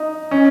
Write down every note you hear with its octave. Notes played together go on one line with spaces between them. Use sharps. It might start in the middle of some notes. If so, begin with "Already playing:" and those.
Already playing: D#4
C#4